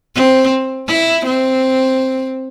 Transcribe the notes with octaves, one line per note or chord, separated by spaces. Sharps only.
C4
E4
C4